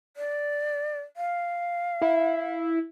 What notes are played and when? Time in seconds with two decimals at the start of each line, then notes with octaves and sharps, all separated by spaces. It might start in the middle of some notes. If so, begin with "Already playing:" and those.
0.17 D5
1.17 F5
2.01 E4